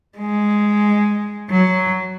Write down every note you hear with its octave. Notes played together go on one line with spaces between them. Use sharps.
G#3
F#3